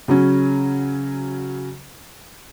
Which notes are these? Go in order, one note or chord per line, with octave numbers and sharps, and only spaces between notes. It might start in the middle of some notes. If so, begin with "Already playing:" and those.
C#3 F#3 C#4